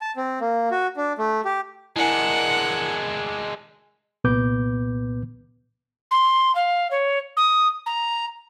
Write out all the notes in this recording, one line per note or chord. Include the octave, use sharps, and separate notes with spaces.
A5
C4
A#3
F#4
D4
A3
G4
G#3 D4 E4 A#4 F#5 G#5
C2 A#2 B3 B4 D6 G6
C6
F5
C#5
D#6
A#5